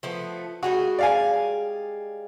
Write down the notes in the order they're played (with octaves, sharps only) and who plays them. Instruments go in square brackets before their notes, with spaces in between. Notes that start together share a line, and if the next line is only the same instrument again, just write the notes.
[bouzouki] F3 A3 B3
[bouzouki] G3 G#3 G#4 [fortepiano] F#4
[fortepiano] D5 F5 G#5